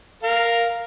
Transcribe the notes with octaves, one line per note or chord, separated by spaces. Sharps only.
A#4 F5